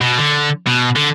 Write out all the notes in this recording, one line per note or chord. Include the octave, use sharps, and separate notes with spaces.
B2
D3
B2
D3